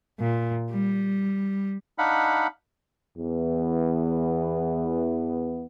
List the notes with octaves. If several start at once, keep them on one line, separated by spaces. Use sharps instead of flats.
A#2
G3
D4 D#4 F5 F#5 B5
E2 E3 B3